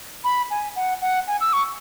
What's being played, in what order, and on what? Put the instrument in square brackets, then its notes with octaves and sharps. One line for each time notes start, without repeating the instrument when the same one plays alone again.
[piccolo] B5
G#5
F#5
F#5
G#5
E6
C#6